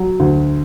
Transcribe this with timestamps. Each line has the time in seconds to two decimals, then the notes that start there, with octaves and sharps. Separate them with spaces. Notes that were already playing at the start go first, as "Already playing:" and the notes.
Already playing: F#3
0.20 D2